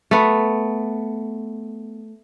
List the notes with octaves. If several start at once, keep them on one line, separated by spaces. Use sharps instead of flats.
A3 B3